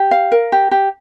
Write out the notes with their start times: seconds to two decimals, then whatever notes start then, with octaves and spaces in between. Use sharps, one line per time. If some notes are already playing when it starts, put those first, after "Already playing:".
Already playing: G4
0.11 F5
0.32 A#4
0.52 G4
0.71 G4